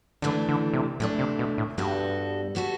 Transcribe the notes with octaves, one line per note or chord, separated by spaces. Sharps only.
D3 E3 A3 D4
D3
C3
A2 E3 A3 D4
C3
B2
A2
G2 G3 B3 F#4 A4
G3 B3 F#4 A4